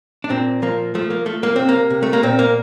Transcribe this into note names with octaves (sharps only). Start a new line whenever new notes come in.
D4
A#2 C4
F3 A#3
F3 A3
A#3
F3 A3
A#3
C3 C4
A#3
C3
A3
A#3
A#2 C4
A#3